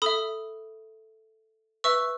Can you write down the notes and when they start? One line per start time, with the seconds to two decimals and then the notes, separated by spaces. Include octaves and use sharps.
0.02 A4 E5 B5 D#6
1.84 B4 E5 C#6 E6